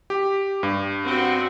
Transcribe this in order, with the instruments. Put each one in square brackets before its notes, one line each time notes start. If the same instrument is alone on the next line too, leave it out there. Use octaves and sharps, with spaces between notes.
[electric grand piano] G4
G2
[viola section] C4 F#4